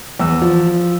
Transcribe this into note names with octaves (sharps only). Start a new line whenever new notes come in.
E2 E6
F3